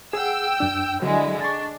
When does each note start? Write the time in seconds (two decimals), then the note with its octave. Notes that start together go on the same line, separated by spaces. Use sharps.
0.13 G#4 F#5 G5 E6
0.60 F#2 D4
1.02 D3 F#3 G#3 E4
1.41 D4 C#6 A6